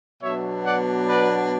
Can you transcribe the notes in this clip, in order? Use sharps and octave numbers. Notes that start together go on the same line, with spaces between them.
B2 F#3 B3 D4 C#5 E5
D5 F#5
B4 D5